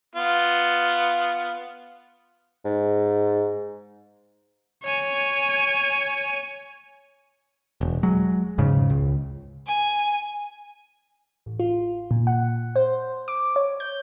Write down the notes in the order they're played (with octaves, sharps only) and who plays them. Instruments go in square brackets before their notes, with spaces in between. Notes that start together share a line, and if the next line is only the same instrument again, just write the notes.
[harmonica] B3 F4
[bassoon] G#2
[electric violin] C#5 G#5
[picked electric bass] E1
F#3 G#3
E1 G#2 C#3
C#2
[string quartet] G#5
[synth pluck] A1
F4
A#2
F#5
C5
D6
C#5
G6